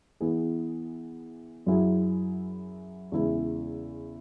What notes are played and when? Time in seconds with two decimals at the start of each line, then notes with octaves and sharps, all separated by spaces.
0.20 E3 B3 E4 G#4
1.66 F#2 F#3 E4 G#4
3.12 E2 C#3 G#3 E4